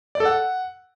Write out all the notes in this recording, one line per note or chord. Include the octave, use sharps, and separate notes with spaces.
D5
A4
F#5